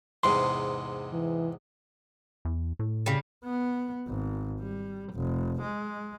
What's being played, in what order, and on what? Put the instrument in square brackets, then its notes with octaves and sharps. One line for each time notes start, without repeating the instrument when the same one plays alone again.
[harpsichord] E2 G#2 C3 [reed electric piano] C6
[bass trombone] E3
[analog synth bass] E2
A2
[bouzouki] C#3 G3
[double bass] B3
G#1
G3
F1
G#3